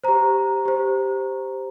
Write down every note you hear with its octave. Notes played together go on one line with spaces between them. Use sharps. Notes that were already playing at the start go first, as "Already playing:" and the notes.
G4 C5 A#5
G4 C5